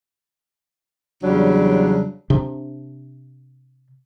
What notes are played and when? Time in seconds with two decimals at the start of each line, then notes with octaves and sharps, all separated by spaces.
1.22 E2 C#3 F#3 G3 D4
2.30 C3 D4